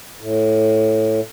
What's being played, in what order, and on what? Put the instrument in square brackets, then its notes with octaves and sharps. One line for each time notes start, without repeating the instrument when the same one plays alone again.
[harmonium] A2